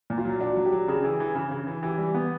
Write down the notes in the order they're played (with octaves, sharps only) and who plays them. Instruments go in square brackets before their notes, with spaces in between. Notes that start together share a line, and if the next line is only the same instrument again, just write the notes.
[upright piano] A#2
[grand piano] F4
[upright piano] F#3
[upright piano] D4 [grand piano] F#4
[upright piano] F#3
[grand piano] G4
[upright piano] F#3
[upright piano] C#3 [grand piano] G#4
[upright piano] E3
E3
C#3
C#3
E3
[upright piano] E3 [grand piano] G4
[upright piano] G3
B3